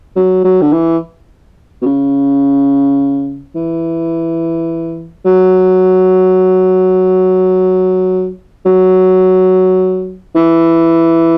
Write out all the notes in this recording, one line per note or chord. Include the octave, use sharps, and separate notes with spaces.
F#3
F#3
D3
E3
B2
C#3
E3
F#3
F#3
E3